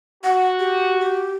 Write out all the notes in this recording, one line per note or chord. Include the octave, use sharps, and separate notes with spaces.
F#4 F#5
G4
G4